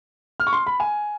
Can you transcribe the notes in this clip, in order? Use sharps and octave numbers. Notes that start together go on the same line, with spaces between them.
F6
C#6
C6
B5
G#5